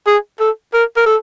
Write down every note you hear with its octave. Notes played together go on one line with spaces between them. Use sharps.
G#4
A4
A#4
A#4
A4